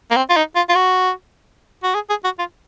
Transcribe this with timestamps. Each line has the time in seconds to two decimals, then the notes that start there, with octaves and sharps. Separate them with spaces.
0.11 A#3
0.16 C4
0.30 F4
0.36 D#4
0.55 F4
0.69 F4
0.75 F#4
1.83 F#4
1.94 G#4
2.10 G#4
2.24 F#4
2.39 F4